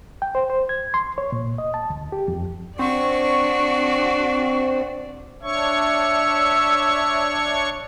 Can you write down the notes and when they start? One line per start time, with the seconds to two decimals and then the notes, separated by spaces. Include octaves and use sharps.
0.22 G5
0.35 C5
0.50 C5
0.69 G#6
0.94 C6
1.18 C#5
1.32 A#2
1.58 D#5
1.74 A5
1.90 D2
2.12 G4
2.28 F2
2.79 C4 D4 F#4 D5 C#6
5.43 D4 C#5 E5 C#6